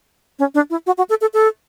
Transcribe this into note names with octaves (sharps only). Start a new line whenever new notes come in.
C#4
D4
E4
F#4
F#4
A4
A4
A4